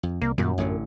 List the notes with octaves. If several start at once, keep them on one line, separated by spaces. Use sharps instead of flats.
F2
C2 A#3
F#2 A#2 D#3 G3
A1 A2 D3